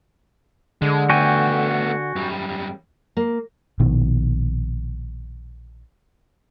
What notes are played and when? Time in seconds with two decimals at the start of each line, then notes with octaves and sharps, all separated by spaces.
0.82 D3 G#3
1.10 A3 B3 F#4 G5 G#5
2.16 F#2 G3
3.17 A#3
3.80 A#1 B2 D#3